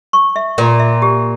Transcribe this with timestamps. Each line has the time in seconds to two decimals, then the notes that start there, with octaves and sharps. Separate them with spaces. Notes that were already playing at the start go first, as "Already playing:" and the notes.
0.13 C#6
0.36 E5
0.58 A#2 A#4
0.80 E5
1.02 G4